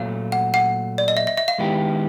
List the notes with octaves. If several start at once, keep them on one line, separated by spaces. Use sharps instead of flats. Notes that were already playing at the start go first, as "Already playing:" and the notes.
Already playing: A#2 F#3 A3 F5
F#5
F#5
D5
D#5
E5
E5
E5
F5
D#3 G#3 B3 E4 G4